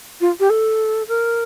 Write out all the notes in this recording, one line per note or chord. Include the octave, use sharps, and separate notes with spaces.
F4
G4
A4
A#4